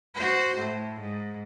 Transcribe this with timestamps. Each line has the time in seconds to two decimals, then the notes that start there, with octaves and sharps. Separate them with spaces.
0.15 F#4 C5
0.57 A2
0.99 G#2